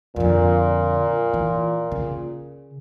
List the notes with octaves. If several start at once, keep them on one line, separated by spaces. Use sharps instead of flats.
F2 A#2 D3
E3
C#3